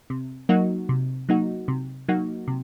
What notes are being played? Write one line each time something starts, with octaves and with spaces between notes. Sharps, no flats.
C3
F#3 A#3 D#4 F#4
C3
F#3 A#3 D#4 F#4
C3
F#3 A#3 D#4 F#4
C3